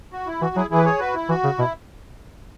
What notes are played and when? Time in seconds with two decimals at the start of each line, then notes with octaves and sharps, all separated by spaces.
0.12 F#4
0.27 E4
0.41 E3 F#4
0.55 F#3 E4 G#4
0.70 E3 E4 G#4
0.78 B4
0.85 G#4 C#5
0.99 F#4 B4
1.14 E4
1.29 E3 F#4
1.44 C#3
1.58 B2 E4